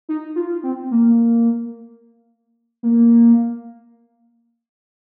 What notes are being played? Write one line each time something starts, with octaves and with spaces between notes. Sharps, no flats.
D#4
F4
C4
A#3
A#3